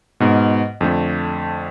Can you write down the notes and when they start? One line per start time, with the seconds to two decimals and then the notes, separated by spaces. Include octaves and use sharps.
0.20 G#2 B2
0.81 F2 D3 A3